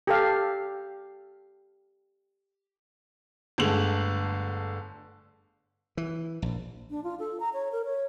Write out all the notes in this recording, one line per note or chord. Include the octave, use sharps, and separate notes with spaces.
G4 A4 F5
G1 D3 G#3 A3 F#7
E3
A#1
D4
F4
A4
A#5
C#5
A#4
C#5